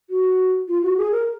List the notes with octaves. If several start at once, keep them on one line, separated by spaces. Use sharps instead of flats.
F#4
F4
F#4
G#4
A#4